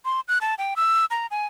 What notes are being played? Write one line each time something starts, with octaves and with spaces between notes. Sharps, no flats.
C6
F#6
A5
G5
E6
A#5
G#5